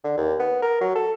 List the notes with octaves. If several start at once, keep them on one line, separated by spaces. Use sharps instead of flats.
D3
D#2
B3
A#4
F#3
A4